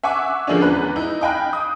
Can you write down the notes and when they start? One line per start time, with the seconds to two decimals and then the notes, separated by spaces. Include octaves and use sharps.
0.04 E5 F#5 G#5 C#6 D6
0.47 D3 F3 G#3 A#3 C#4 D4
0.61 E2 B4 F#6
0.96 D#4 E4
1.21 D#5 F5 G5 G#5 B5 F#6
1.53 D#6